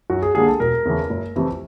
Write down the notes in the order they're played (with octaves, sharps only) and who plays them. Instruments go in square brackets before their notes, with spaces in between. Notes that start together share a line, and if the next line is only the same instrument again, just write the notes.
[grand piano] F#2 F#4
G#4
D3 G3 A#3 D4 G#4
A4
E1 A#4
E2 C#3 E3 A3
F#1
F2 C3 E3 A3